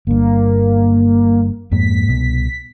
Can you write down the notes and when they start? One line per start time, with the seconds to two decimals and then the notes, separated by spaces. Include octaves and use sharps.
0.07 G1 G2 A#3
1.71 F2 G#2 A#3 B6
2.09 C2 B2